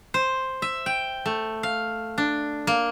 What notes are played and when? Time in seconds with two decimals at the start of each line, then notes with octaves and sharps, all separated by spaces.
0.14 C5
0.62 E5
0.86 G5
1.26 A3
1.63 F5
2.18 D4
2.67 A#3